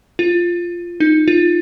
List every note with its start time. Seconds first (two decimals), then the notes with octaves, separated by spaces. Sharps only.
0.19 F4
1.00 D#4
1.28 F4